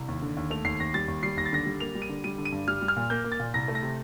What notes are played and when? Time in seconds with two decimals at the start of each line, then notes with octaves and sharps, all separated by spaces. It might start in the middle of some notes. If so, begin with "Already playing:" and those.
Already playing: C2
0.08 D#2
0.22 D3
0.37 D#2
0.50 A3 F7
0.65 D#2 C7
0.80 D#2 A#6
0.94 G3 A6
1.08 D#2
1.23 G3 C7
1.37 D#2 A#6
1.46 A6
1.52 D3 A#6
1.66 G3
1.80 A#3 F7
1.95 G3
2.02 D#7
2.09 D3
2.24 G3 D#7
2.38 D3
2.45 D#7
2.52 G2
2.68 G3 F6
2.82 G3
2.88 F6
2.96 A#2
3.10 A#3 G6
3.24 A#3
3.32 A6
3.40 A#2
3.53 C2 A#6
3.68 A3
3.75 A#6
3.83 C3